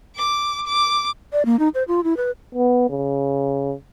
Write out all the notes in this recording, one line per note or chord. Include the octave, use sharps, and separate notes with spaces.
D6
D6
D5
A#3
D#4
C5
F4
E4
B4
B3
C#3